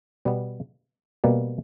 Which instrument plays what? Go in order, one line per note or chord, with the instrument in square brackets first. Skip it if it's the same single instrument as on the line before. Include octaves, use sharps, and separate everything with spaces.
[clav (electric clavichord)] B2 G3 B3
B2 G3 A#3